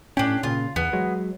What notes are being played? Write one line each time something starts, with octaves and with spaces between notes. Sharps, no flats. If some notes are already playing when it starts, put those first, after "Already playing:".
A2 C#4 D4 G4
A#2 C#3 F4
E2 B3
F#3 G#3